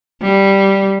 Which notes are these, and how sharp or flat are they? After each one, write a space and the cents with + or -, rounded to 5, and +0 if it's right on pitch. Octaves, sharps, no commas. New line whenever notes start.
G3 -5